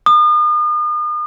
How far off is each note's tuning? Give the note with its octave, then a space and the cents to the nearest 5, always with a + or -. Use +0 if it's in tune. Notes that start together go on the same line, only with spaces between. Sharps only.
D#6 -40